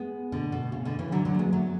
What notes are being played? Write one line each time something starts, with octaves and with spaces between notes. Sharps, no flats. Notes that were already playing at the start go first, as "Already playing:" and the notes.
Already playing: G#3 B3
B2 D3
B2
C#3
B2 D3
C#3 E3
D3 F#3
D3 F#3
A3
G#3 B3
F#3 A3